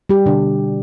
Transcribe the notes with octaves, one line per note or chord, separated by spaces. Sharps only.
G3 G4
B2 D3 G3 D4